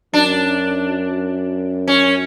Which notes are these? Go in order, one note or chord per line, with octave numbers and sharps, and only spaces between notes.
F#2 D4
C#4